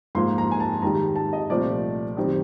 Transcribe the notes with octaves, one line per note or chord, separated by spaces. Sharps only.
G#2 F3 A#3 C6
A#5
G#5
A5
G#2 D#3 G3 A#5
A5
D#5
C2 A#2 F3 A3 C4 D5
F#2 D#3 G3 C4